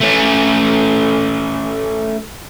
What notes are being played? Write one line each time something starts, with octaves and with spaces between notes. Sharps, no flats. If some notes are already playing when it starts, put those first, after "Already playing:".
A3 C#4